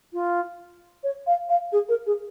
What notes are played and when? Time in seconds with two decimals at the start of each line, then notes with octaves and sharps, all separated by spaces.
0.13 F4
1.04 C#5
1.27 F5
1.49 F5
1.72 G#4
1.89 A#4
2.06 G#4